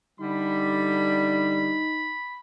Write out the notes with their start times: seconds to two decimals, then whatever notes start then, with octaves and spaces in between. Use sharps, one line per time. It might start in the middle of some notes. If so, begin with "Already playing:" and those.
0.20 D3 G3 D#4 B5